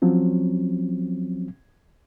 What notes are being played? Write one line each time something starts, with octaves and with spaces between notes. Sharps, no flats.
F3 F#3 C4 C#4